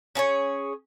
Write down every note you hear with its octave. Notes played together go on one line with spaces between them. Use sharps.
C#4 G#4 A#4 C#5